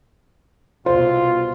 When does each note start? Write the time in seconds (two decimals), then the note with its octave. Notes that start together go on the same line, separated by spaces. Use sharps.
0.86 C2 B2 F4 C5